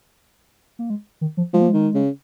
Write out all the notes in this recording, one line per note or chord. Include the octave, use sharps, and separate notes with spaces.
A#3
G#3
D#3
F3
F3 G#3
A#3
D#3 G#3
C#3